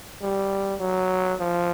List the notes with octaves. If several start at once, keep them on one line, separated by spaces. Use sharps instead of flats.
G3
F#3
F3